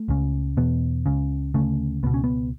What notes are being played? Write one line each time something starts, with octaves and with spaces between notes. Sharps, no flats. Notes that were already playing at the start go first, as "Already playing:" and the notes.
Already playing: A3
C#2 C#3
E2 B2 B3
C#2 C#3
D2 C#3 A3
C#2 B2 B3
C#4
B3